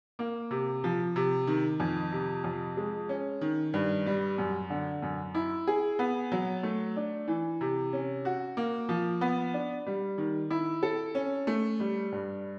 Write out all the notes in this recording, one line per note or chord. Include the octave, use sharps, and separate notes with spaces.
A#3
C3
F3
C3
D#3
F2
C3
F2
G#3
C#4
D#3
G2
G3
F#2
D3
F#2
E4
G#4
B3
F#3
A3
D4
E3
C3
C#4
F#4
A#3
F3
B3
D4
G3
D#3
E4
A4
C#4
A3
G3
G2